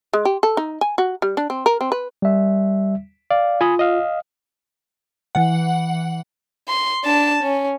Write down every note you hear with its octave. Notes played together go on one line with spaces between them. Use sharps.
G#3
G4
A4
D#4
G#5
F#4
G3
D4
C4
A#4
C4
B4
G3 E5
D5 F5
F4 G#5 B5 D#6
D#5 F5
E3 F#5
C6
D4 A5
C#4